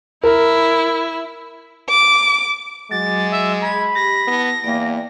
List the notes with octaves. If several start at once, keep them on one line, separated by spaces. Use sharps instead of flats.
E4 A#4
D6
F#3 G#3 F#4 D6 A6
E5
G#4 B5 G#6
G4 A#6
B3 E4 A5
E2 A#3 D5 G5